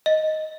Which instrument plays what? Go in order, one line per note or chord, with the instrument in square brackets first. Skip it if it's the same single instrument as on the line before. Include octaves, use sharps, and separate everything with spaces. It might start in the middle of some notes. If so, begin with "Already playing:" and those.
[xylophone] D#5